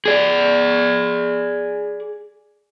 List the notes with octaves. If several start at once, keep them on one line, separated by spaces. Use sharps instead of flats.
G#4 D5